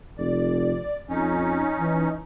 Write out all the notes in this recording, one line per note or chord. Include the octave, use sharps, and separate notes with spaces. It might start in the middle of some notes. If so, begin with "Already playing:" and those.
F1 D5
F2 C#4 D#4
E3